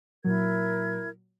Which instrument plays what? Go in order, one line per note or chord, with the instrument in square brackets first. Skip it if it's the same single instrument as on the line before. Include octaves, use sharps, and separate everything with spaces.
[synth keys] A#2 F#3 [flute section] E4 A#4 G#6